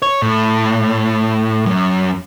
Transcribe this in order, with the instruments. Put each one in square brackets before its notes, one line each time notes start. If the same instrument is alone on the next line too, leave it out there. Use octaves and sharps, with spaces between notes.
[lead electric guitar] C#5
A2
F#2